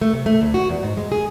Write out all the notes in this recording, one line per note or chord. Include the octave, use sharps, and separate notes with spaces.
A3
C3
A3
D2
F#4
E2
G#2
G#3
G#4